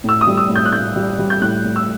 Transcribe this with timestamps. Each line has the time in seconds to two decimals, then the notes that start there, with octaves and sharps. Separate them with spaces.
0.04 A2 E6
0.21 D#6
0.27 G3
0.37 E6
0.49 A2
0.55 G6
0.65 F#6
0.72 A2 G6
0.96 G3
1.19 G3
1.30 G6
1.42 A2 F#6
1.65 A2
1.76 E6